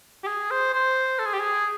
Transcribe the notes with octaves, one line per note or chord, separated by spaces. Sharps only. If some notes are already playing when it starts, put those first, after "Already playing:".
G4
G#4
C5
C5
A4
G#4
G4
G#4